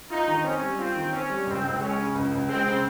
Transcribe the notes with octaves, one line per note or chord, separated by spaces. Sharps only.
D#4 F4
D#3
C4 C#4
G3
C4 F4
D#3
C4 C#4
G3
C#2 C4
C#2
G#3 C#4
C#3
C#2
C#2
G#3 C4
C#3